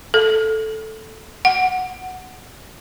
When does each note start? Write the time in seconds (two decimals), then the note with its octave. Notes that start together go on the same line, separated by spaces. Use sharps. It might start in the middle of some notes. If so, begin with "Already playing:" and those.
0.14 A4
1.45 F#5